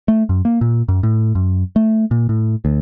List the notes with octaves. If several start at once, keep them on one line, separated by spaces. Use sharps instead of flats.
A3
F#2
A#3
A#2
F#2
A2
F#2
A3
A#2
A2
D2